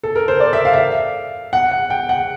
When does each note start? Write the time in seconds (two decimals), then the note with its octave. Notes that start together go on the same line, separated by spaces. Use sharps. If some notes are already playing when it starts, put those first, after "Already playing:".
0.03 A4
0.15 A#4
0.28 C5
0.40 D5
0.53 E5
0.65 F5
0.73 E5
0.78 F5
1.53 F#5
1.71 F#5
1.90 G5
2.09 F#5